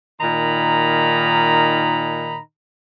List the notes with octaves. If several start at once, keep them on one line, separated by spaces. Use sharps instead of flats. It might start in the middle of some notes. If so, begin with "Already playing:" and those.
A#2 D#3 D#4 A#5 B5